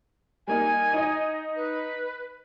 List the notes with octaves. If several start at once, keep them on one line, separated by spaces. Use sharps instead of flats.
G3 A#3 D#4 G#5
D#4 D#5
B4